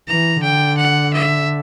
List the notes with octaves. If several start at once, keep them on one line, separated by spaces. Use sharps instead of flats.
E3 A#5
D3 G5
F#5
E5